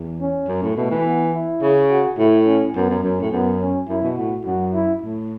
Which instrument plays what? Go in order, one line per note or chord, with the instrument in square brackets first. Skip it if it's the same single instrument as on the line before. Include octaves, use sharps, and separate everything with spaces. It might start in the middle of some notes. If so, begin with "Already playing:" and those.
Already playing: [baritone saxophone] E2
[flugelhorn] C#4
[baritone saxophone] F#2
A2
[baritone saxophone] B2 [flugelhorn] A3
[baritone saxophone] E3
[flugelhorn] B3
E4
[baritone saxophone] C#3
[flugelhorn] F#4
[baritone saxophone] A2 [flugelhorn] E4
[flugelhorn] C#4
[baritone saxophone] F#2 [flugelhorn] B3
[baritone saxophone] F#2
[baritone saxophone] F#2 [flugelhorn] C#4
[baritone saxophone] A2
[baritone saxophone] F#2 [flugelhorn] B3
[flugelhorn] C#4
[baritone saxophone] F#2 [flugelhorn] E4
[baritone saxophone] B2
[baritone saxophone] A2 [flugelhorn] F#4
[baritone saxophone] F#2 [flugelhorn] F#4
[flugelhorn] E4
[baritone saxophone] A2